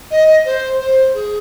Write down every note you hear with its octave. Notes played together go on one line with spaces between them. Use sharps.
D#5
C5
C5
G#4